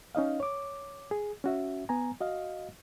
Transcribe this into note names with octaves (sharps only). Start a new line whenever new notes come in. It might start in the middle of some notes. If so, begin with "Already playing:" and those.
C#4 D#4 D#5 F5
C#5 D6
G#4
C#4 F#4 E5
B3 G#5 A#5
F#4 D#5 F5